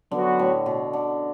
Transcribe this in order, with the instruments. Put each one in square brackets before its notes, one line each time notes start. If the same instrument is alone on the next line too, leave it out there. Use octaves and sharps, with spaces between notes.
[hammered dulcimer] D3 [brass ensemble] F#3 B3 F#4
[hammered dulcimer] A2
B2
D3